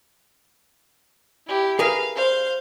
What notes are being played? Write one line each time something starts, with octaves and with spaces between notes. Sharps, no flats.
E4 G4
G#4 A#4 B4 F5
C5 F5